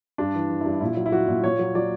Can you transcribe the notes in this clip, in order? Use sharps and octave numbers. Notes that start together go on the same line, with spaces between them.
G2 D4
E3
E3
G2 E4
A#2 E4
F#3
E4
F#3 F#4
A#2
A#2 C#5
F#3
F#3 D5